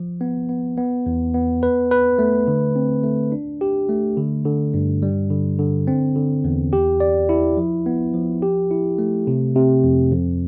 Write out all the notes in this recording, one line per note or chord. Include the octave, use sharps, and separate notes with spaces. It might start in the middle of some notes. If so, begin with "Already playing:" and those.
Already playing: F3
B3
B3
B3
E2
B3
B4
B4
A3
D3
C4
A3
D4
G4
A3
D3
D3
G2
G3
D3
D3
C4
D3
E2
G4
D5
E4
F3
B3
F3
G4
E4
A3
C3
C3
F2
F2